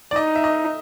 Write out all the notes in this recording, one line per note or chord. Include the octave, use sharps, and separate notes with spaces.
D5
D#4 D#5
E5
D#5